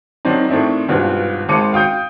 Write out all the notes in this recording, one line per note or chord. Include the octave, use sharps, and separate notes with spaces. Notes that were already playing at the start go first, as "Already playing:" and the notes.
D#3 F#3 C4 D4 D#4
A2 D#3 C4 D4 E4
G#1 G2 B2 B3 F4
G#1 G#3 A5 D6 C#7 D#7
F5 G5 D#6 G6 D7